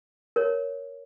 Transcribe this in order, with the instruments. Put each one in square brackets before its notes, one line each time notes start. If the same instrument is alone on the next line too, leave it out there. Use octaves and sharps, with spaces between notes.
[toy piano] A#4 C#5